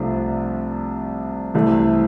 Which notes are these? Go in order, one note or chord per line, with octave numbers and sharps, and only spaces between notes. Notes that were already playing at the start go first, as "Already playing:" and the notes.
Already playing: C2 C3 F3 A3 D4
C2 C3 E3 A3